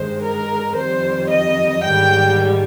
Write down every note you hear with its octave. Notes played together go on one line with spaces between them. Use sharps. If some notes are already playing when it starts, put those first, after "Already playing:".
Already playing: G2 D#3 G#3 C5
A#4
F2 D#3 G3 C5
D#5
G#2 D#3 G3 G5